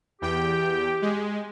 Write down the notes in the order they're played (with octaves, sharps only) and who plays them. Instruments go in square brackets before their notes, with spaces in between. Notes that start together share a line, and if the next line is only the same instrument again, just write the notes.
[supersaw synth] E2 G5 [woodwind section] G4
[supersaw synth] G#3